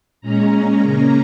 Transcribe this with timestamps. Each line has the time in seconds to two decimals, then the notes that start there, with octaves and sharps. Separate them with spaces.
0.21 A#2 G#3 C#4 A#5
0.52 A#5
0.82 C#3 A#3 C#4 A#5